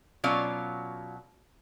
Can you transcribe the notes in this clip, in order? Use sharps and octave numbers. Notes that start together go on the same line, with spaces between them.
B2 F#3 C#4 F4 D5 F5